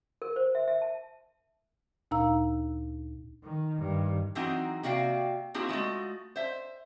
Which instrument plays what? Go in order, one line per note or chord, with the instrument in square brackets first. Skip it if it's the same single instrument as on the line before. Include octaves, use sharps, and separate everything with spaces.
[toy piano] A#4
C5
E5
E5
A5
[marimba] D2 A#2 D#4 F5 A#5 E6
[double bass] D#3
G2 D#3
[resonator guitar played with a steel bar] E3 F#3 C4 D#4 F#4 G#4
C3 A#3 F#4 D5 F5 G5
A#3 C4 D#4 E4 F#4 G#4
G#3 A3 F4 F#4
C5 E5